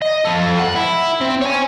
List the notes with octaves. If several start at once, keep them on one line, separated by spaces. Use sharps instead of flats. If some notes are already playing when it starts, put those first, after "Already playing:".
D#5
F3 A4
F#5
E4
C4
C#5 G#5